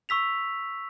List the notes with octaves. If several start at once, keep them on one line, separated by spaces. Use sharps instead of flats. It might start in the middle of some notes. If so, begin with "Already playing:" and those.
C#6 E6 B6 F7